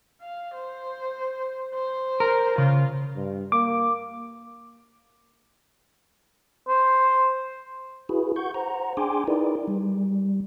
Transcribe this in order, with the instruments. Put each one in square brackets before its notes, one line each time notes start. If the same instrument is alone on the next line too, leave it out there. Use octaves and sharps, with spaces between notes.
[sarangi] F5
C5
C5
[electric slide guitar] A#4
[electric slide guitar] C#3 [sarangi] F4
[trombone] G2
[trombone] A#3 [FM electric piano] D6
[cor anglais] C5
[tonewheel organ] E4 F#4 G#4 B4
F#5 C#6 G6
C5 F#5 A#5
D4 G#4 G5 G#5 C6 D6
D#4 E4 G#4 A#4 B4 D5
G3